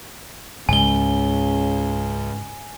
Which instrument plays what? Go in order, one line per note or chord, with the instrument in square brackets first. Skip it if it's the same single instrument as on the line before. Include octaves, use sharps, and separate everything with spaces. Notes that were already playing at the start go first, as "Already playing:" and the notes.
[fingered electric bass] C#2 [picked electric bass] G#2 G#3 [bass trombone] C#3 [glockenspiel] G#5 G7